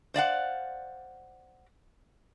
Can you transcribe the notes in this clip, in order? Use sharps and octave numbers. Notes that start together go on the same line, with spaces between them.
C5 D5 F5 F#5